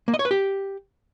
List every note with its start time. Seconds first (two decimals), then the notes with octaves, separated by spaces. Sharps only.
0.08 A#3
0.14 D#5
0.19 C#5
0.25 B4
0.31 G4